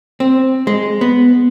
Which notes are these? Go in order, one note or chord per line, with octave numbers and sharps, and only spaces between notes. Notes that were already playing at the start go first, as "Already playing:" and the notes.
C4
G#3
B3